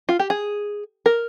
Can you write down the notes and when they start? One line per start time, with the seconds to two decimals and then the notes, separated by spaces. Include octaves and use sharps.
0.09 F4
0.19 G4
0.30 G#4
1.06 A#4